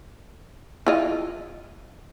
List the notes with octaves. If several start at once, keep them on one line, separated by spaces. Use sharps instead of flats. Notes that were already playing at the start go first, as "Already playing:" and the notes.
E4 F4 D#5